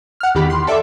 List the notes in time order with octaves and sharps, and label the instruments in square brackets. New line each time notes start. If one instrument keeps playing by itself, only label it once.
[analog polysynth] F#5 F6
E2 D#3 G4 B5
C6
A4 D5 E5